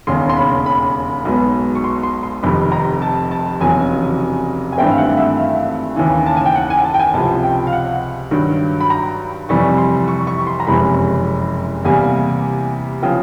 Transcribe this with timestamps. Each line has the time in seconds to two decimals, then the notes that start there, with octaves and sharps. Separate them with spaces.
0.07 E1 D#2 C#3 C6
0.29 C6
0.37 B5
0.66 B5
1.25 B1 B2 G#3 B3
1.75 C#6
1.84 C6
2.03 C6
2.23 C6
2.43 F1 F2 C3 D#3 B5
2.72 A#5
3.02 A5
3.31 A5
3.61 F1 E2 C#3 F#3 G#5
4.72 G#5
4.78 G#1 G2 E3 A3 C4 G5
4.91 F5
4.98 F#5
5.17 E5
5.37 F5
5.96 D#2 C#3 E3
6.26 A5
6.36 G#5
6.46 G5
6.55 F#5
6.70 G#5
6.84 A5
6.94 G5
6.99 G#5
7.13 C#2 C3 F3 A5
7.44 G5
7.67 F5
7.73 F#5
8.31 G2 D#3 F#3
8.80 B5
8.90 A#5
9.49 F2 C3 E3 G3 C#6
9.78 C6
10.08 C#6
10.27 C#6
10.47 C6
10.60 A#5
10.67 F#1 F2 C3 E3 G#3 B5
11.85 E2 C3 E3 G3 A#3 G#5
13.02 C#3 F3 G5